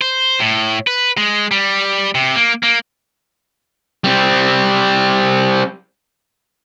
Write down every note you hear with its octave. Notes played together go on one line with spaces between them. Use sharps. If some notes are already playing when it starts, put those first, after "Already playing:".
C5
A2
B4
G#3
G3
C3
A#3
A#3
G3 C4